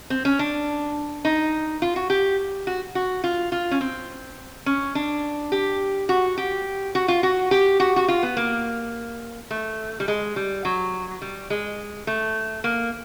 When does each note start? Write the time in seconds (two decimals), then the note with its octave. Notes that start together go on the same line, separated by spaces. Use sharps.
0.10 C4
0.25 C#4
0.39 D4
1.25 D#4
1.82 F4
1.96 F#4
2.10 G4
2.67 F#4
2.95 F#4
3.24 F4
3.52 F4
3.71 C#4
3.81 C4
4.66 C#4
4.95 D4
5.52 G4
6.09 F#4
6.38 G4
6.95 F#4
7.08 F4
7.23 F#4
7.51 G4
7.80 F#4
7.96 F#4
8.08 F4
8.23 B3
8.37 A#3
9.51 A3
10.00 G3
10.08 G#3
10.36 G3
10.65 F#3
11.22 G3
11.50 G#3
12.07 A3
12.64 A#3